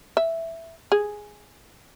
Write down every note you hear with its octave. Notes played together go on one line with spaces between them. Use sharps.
E5
G#4